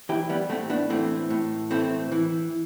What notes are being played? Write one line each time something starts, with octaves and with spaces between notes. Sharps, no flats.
E3 E4 G4
G3 B3
A2 A3 C4
B3 D4
E3 A3 C4
A2
E3 A3 C4
E3